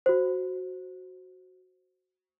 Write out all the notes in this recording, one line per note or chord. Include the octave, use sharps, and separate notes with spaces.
F#4 C5